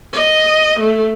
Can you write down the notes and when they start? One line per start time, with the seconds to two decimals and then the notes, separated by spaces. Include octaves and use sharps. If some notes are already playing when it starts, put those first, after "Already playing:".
0.13 D#5
0.80 A3